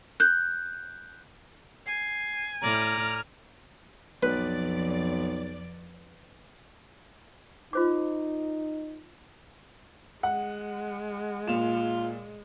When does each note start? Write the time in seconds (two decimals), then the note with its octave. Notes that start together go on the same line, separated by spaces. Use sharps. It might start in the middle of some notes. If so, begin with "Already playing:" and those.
0.20 F#6 G6
1.87 G#5 C7
2.61 A2 D5 A#5 F6
4.23 B1 F2 B4 D5
7.73 D#4 F4 C5 D6
10.23 G#3 F#5
11.47 A#2 F4 E7